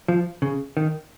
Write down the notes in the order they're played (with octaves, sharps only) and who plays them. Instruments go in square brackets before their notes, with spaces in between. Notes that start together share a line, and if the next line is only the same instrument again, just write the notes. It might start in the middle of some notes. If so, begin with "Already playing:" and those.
[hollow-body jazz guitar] F3
C#3
D#3